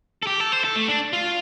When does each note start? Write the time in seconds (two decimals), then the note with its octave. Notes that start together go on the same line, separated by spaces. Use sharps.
0.23 A4
0.27 G4
0.40 A4
0.52 C5
0.64 A4
0.76 A3
0.88 D4
1.13 F4